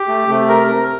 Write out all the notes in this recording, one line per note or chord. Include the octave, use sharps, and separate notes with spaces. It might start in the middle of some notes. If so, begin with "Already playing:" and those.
Already playing: G4
A3
C3 A3
A#4
A#4